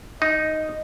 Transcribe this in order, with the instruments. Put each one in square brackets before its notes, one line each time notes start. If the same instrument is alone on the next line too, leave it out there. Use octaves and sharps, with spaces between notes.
[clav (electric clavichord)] D#4 [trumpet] D#5